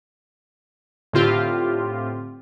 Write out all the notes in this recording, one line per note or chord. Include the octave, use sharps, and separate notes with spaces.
A2 D3 C4 F4 G4